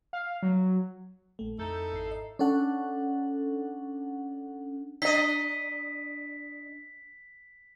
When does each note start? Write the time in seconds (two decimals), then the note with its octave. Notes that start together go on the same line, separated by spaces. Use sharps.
0.13 F5
0.42 F#3
1.39 A#1 A3
1.58 F2 D#4 E4 A4 G6
1.93 G#1 C7
2.11 D#5
2.39 C#4 D4 A4 F#5
5.02 D4 D#5 B6